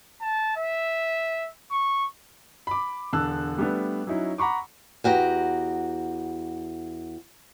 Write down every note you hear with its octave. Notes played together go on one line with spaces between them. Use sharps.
A5
E5
C#6
B5 D6
E1 D3 A5 E6 F#6
G3 A3 B3 D4
F#3 C#4 D#4 E4
F#5 A#5 B5 C#6 D6
E2 F#4 G4 A#5